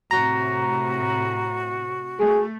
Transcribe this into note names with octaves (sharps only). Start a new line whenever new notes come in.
A2 C3 F#4 A#5
A3 G#4